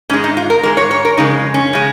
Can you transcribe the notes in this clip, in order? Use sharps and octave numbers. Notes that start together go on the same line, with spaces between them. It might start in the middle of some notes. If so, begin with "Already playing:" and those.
G#2 G#3 C#4
D#4
F4
A#4
G#2 G#3 A#4
C#5
C#5
A#4
F2 C#3 G#3 D#4
C#4
C#3 G#3